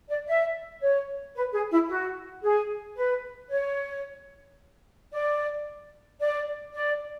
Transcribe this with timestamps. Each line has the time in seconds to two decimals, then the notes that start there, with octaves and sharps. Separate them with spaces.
0.09 D5
0.26 E5
0.80 C#5
1.35 B4
1.52 G#4
1.70 E4
1.88 F#4
2.43 G#4
2.96 B4
3.50 C#5
5.12 D5
6.20 D5
6.73 D5